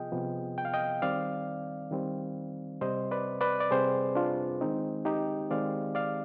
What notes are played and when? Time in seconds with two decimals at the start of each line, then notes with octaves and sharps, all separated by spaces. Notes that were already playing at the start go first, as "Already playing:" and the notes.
Already playing: C3 F3 B3 F4 G#4 D#5 G5
0.12 C3 F3 B3
0.58 G5
0.65 F5
0.74 D#5 G5
1.02 D#3 G3 C4 D5 F5
1.91 D#3 G3 C4
2.81 C3 G3 C4 C5 D#5
3.11 B4 D5
3.41 B4 D5
3.60 D5
3.71 C3 G3 C4 G#4 C5
4.15 D4 F4
4.61 D#3 G#3 C4 D#4
5.05 D#4 G4
5.50 D#3 G#3 C4 D5 F5
5.95 D5 F5